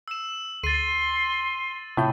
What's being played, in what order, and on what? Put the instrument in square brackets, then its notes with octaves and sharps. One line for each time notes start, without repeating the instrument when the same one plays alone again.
[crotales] E6 E7
[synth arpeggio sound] D2 C7 [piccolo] C6 [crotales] A6 D#7
[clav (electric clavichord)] A2 [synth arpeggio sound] C3 F4 G6